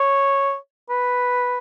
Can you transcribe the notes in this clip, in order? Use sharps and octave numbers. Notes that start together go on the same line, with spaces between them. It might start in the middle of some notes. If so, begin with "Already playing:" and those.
Already playing: C#5
B4